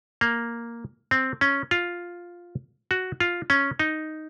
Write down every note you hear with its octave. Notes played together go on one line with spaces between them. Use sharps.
A#3
C4
C#4
F4
F#4
F4
C#4
D#4